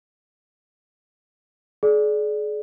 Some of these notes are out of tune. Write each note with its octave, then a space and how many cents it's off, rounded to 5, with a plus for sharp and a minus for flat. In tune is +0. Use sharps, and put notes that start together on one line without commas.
G#4 +35 D5 +0